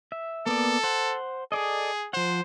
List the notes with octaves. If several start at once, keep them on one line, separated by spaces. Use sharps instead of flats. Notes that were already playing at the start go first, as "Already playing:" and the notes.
E5
A#3 B3 A4 D5
C5 F#5
G#4 A4 D5 D#5
F3 C5 F#5